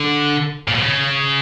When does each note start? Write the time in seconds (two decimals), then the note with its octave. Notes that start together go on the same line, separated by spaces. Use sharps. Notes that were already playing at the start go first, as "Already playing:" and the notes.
Already playing: D3
0.68 A#2
0.75 B2
0.82 C#3